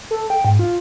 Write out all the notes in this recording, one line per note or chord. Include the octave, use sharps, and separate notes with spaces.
A4
G5
G#2
F4